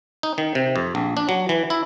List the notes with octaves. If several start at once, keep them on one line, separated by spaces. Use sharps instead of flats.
D#4
D#3
C3
F2
A#1
D4
F#3
E3
E4